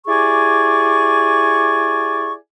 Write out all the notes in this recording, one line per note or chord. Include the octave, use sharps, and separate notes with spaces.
E4 G4 G#4 D5 G#5 C#6